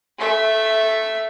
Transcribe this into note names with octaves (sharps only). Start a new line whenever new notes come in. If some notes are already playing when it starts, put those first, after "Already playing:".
A3 E5